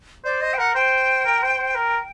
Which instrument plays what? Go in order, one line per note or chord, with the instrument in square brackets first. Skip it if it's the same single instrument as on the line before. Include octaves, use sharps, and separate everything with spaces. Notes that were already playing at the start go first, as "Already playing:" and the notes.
[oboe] C5 [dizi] D5
[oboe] C5 [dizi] D#5
[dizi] G5
[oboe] A#4 [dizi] F#5
[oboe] C5 [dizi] G5
[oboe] A#4
C5
C5
A#4